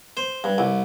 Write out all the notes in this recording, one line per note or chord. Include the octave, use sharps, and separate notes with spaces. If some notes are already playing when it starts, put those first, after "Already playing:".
C5
G2
C2